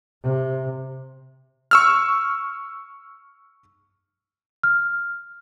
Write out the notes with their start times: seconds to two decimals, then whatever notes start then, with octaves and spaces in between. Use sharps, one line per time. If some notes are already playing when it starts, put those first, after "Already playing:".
0.23 C3
1.71 C#6 E6 F6
4.63 F6